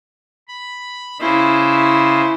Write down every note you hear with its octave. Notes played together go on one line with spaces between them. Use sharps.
B5
C#3 E4 C5